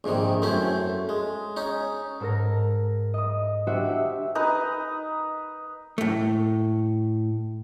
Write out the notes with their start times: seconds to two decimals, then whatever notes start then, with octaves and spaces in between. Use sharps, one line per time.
0.04 A#1 G#2 C3 D#3
0.42 F#2 A3 C4 C#4 E4
1.09 G#3
1.57 C#4 D#4
2.20 G#2 A4 A#4 A#6
3.14 D#5 D#6
3.67 D4 F#4 G4 C5 E5
3.85 G4 E5
4.35 D#4 B4 D#5
5.98 A2 A3